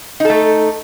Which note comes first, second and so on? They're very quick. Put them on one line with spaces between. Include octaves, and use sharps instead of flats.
D#4 A4 A3